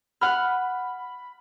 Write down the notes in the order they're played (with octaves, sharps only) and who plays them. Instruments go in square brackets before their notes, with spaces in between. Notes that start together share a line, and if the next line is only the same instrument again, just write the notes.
[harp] F#5 F6 [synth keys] B5